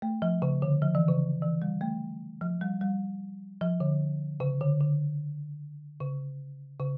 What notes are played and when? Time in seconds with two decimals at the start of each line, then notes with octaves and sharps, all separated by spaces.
0.02 A3
0.22 F3
0.42 C#3
0.62 D3
0.82 F3
0.95 E3
1.08 C#3
1.42 E3
1.62 G3
1.81 A3
2.41 F3
2.61 G3
2.81 G3
3.61 F3
3.80 D3
4.40 C#3
4.61 D3
4.81 D3
6.00 C#3
6.80 C#3